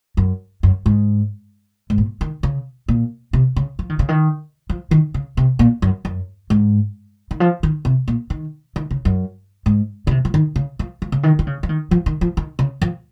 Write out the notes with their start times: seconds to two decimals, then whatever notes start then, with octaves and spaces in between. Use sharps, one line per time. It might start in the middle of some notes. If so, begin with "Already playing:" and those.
0.17 F#2
0.63 F#2
0.86 G#2
1.90 G#2
1.98 A#2
2.21 D#3
2.43 C#3
2.88 A#2
3.33 C3
3.56 C#3
3.79 F3
3.90 D#3
3.99 C#3
4.09 D#3
4.69 F3
4.91 D#3
5.14 C#3
5.37 C3
5.59 A#2
5.82 F#2
6.05 F#2
6.50 G#2
7.31 D#3
7.40 F3
7.63 D#3
7.85 C3
8.08 A#2
8.30 D#3
8.76 D#3
8.91 C#3
9.05 F#2
9.66 G#2
10.07 C#3
10.11 C3
10.25 F3
10.34 D#3
10.56 C#3
10.79 F3
11.02 F3
11.12 C#3
11.23 D#3
11.39 D#3
11.47 C#3
11.63 F3
11.69 D#3
11.91 F3
12.06 D#3
12.21 F3
12.37 D#3
12.59 C#3
12.82 F3